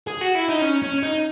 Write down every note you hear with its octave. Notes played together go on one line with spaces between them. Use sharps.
G#4
F#4
E4
D#4
C#4
C#4
D#4